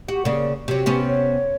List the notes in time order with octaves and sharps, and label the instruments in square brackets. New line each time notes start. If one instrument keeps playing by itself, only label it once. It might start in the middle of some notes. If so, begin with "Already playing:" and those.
[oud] F#4 [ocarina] G4
[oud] C#3 A#3 [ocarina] D5
[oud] C3 F#3 [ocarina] G4
[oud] C3 B3 C#4
[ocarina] C#5